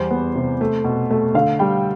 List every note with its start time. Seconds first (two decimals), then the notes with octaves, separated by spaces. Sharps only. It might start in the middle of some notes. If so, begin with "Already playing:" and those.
Already playing: E2 G3 C5
0.11 B3
0.35 C3
0.61 A3
0.84 B2
1.10 A3
1.34 D3 F5
1.59 G3 G5